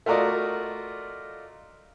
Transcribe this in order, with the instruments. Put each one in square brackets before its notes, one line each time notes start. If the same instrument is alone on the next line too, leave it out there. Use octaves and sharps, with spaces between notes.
[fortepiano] A3 F4 F#4 A#4 D5 D#5